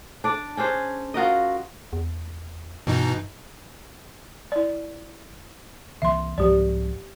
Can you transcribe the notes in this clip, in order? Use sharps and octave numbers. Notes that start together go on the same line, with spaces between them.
D4 D5
C#4 D4 G#4 C5
F4 F#4 A#4 D#5
E2
G2 B2 E3 D#4
E4 D5
C2 E3 A#3 E5 C6
C2 G#2 F3 G4 D5